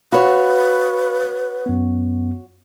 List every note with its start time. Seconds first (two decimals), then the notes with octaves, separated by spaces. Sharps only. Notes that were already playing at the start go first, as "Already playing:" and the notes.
0.12 F#4 B4 C#5 F5 B5
1.66 F#2 B3